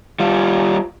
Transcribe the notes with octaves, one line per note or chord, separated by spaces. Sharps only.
G3 F4